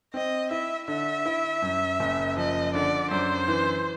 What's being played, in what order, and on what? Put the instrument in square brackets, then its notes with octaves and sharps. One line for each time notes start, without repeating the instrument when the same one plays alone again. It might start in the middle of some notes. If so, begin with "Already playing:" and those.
[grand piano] C4 [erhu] D#5
[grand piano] E4 [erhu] E5
[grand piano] D3 [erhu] E5
[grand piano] E4
F#2
F#1
[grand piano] F3 [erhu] D#5
[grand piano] D3 [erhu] D5
[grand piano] F#2 [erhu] C5
[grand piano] E3